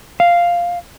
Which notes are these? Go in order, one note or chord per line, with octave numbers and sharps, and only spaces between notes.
F5